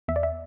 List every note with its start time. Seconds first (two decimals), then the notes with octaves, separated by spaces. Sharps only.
0.08 E2 E5
0.16 D5
0.23 E5